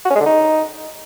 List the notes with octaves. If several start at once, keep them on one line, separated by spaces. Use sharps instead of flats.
F#4
C#4
G#3
D3
D#4